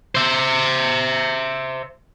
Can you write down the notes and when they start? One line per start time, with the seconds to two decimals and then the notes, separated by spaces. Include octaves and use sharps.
0.15 C5 E5